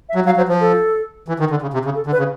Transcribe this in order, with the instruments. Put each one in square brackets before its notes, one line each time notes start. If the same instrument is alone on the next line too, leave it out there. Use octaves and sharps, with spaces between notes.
[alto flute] E5
[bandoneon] F#3
[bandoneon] F#3 [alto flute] F5
[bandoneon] F#3 [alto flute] C5
[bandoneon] F3 [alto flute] C5
[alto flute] A4
[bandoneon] E3
D#3
D3
C#3
C3
C#3
[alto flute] A4
[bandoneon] D3
[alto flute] B4
[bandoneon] C#3